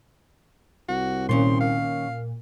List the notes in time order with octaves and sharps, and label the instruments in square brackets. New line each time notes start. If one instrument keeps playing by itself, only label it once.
[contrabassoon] C2 [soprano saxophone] F#4
[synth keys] A#2 [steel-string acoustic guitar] D#3 C#4 G5 [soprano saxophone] C6
[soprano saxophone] F5